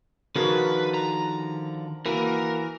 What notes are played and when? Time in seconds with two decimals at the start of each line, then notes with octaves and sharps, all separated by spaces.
0.36 D3 D#3 F3 F#4 G#4 A#4 B4
0.94 A#5
2.06 E3 A#3 F#4 A#4